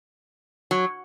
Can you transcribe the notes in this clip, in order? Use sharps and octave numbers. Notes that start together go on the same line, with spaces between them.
F#3